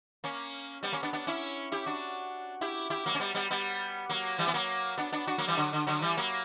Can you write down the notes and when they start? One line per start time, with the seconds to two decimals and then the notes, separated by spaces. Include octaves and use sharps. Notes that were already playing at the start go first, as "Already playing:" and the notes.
0.24 A#3 C#4
0.83 G3 B3
0.92 A#3 C#4
1.03 B3 D4
1.13 B3 D4
1.27 C#4 E4
1.72 E4 G4
1.86 D4 F#4
2.61 E4 G4
2.90 E4 G4
3.06 F#3 A#3
3.15 C#4
3.20 G3 B3
3.35 G3 B3
3.50 G3 B3
4.09 F#3 A#3
4.38 E3 G3
4.47 B3
4.54 F#3 A#3
4.98 B3 D4
5.12 B3 D4
5.27 D4 F#4
5.38 F#3 A#3
5.48 E3 G3
5.57 D3 F#3
5.72 D3
5.87 D3 F#3
6.01 E3 G3
6.17 F#3 A#3